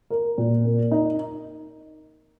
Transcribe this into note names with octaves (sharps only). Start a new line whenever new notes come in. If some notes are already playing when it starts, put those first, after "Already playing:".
A#4
A#2
A#3
D#4